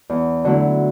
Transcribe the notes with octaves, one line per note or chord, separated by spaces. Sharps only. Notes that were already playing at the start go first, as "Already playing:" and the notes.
E2
D3 F#3 A3 E4